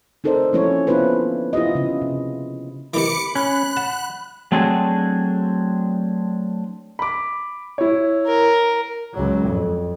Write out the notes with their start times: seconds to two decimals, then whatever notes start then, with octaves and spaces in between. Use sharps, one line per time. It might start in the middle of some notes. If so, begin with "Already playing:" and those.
0.24 C4 D#4 A4 A#4 C5 D5
0.53 F3 A#3 C#4 E4 A4 C#5
0.87 B3 D4 E4 F4 B4 C5
1.53 E4 F4 G4 D#5
1.75 C#3 C#4
2.01 C3
2.94 C3 D#3 E3 B5 D6 C#7
3.35 C#4 F#6
3.77 F#5 A5
4.52 F#3 A3 C4 D4 F#4 G#4
6.99 B5 D6
7.78 E4 C#5
8.26 A#4
9.14 C#2 F#3
9.47 F2